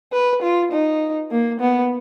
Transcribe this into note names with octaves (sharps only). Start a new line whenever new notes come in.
B4
F4
D#4
A#3
B3